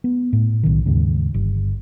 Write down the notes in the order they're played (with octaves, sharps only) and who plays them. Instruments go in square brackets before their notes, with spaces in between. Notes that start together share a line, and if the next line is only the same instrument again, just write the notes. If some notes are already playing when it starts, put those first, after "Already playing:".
[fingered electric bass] B3
A2
B1 D#3
D#2 G#2 C#3
G1